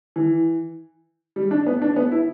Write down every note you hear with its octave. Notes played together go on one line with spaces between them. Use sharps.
E3
G3
D4
B3
D4
B3
E4